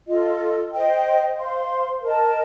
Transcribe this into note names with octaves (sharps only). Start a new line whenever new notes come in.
F4 A4 D#5
C5 D#5 G5
C5 F5 C6
A#4 D#5 A5